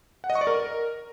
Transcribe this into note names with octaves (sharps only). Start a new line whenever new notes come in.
F#5
D#5
C#6
D5
A#4